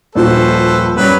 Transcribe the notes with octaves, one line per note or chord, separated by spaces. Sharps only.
D#1 F3 F#4 A4 B4 C5
F#2 F#3 G3 B4